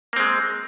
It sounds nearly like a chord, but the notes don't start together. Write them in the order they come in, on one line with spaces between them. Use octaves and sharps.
A#3 C4 G#3